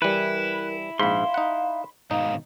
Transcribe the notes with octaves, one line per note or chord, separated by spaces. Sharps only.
E3 G3 E4 A#4 B4
A#1 G#2 F5 B5 C6
D#4 F#5
G#2 B2 D#3 D#4 F5